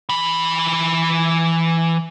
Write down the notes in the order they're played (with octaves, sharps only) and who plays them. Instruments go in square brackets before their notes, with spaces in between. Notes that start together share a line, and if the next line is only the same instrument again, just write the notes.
[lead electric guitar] E3 B5